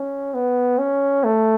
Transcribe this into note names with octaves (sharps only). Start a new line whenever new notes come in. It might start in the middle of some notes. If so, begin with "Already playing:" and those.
Already playing: C#4
B3
C#4
A3